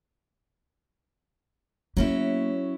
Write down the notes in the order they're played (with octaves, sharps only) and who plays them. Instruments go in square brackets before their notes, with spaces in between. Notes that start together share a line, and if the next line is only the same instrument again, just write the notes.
[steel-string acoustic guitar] F#3 C#4 E4 [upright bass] A#3 B3